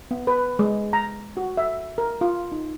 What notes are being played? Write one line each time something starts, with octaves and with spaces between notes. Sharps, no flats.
B3
B4
G#3
A#5
F#4
E5
A#4
F4
D#4